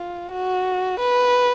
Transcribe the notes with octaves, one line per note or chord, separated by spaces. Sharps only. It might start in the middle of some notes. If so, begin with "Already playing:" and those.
Already playing: F4
F#4
B4